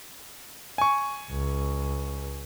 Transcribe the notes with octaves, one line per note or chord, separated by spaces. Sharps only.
G#5 C#6
C#2